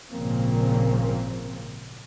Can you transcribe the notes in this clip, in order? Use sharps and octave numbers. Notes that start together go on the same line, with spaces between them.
G#1 A#2 C#3 F3 A#3 C4